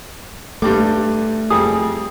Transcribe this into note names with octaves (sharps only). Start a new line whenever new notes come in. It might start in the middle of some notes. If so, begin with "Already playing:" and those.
G2 G3 A3 D6
F2 G3 G#4 D#6